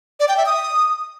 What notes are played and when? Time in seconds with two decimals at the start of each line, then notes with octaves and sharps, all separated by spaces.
0.20 D5
0.29 G5
0.37 E5
0.46 D#6